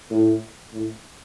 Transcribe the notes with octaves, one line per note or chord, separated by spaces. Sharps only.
A2
A2